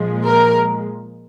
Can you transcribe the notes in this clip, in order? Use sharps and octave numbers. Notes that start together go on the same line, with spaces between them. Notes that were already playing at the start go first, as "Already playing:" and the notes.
Already playing: A#2 F3 G#3
A#4